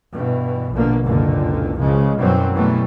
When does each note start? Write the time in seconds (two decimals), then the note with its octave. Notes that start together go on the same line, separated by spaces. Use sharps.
0.13 G2 B2 E3
0.73 A#1 B2 D3 A#3
1.04 F#1 C#2 A#2 D3
1.78 C#2 C#3 F3 G#3
2.17 F#2 B2 E3 F#3 G3 C4
2.53 B2 E3 F#3 G3 A3 B3